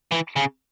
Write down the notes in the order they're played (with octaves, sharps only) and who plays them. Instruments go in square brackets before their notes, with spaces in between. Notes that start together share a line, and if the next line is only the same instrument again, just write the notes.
[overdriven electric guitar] E3
C#3